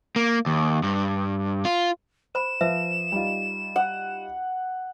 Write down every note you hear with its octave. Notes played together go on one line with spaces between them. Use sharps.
A#3
D#2
G2
F4
C5 B5 E7
F3 B4 C5 E5
G3 D#4 F4
F#5